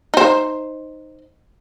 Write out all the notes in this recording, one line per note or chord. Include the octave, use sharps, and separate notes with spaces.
D#4 C5